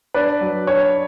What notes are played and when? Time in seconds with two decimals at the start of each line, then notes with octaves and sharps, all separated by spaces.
0.14 D4 B4 D5
0.41 F#3
0.67 D4 C#5